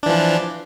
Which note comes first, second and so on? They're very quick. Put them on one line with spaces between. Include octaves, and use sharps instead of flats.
D4 E3 F3